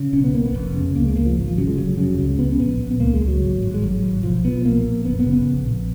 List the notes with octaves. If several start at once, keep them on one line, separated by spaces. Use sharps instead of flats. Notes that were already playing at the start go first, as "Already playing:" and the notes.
Already playing: C#3
B1 C#4
B3
B1 A#3
B3
F1
C#3
C#2 A#3
G#3
C#2 A#3
F3
G#1
F3
C#3 F#3
G#3
F1 F#3
C#3 F#3
C#2 F#3
G#3
C#2 B3
C#4
A#1 B3
A#1
B3
C#2 A#3
G#3
C#2
F#3
G#1
G#1
G#3
G#1 F#3
G#1
B1 F3
B1 B3
A#1 A#3
A#1
F#1 B3
B3
C#3
B3
A#1
A#1